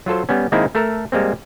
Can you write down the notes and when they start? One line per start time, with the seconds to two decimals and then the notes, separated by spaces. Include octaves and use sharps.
0.06 F#3 F4 A4 C5
0.29 G3 B3 C#4
0.52 D#3 G#3 A#3 C4 D#4 E4
0.75 A3 A4 A#4
1.12 G3 G#3 A#3 C4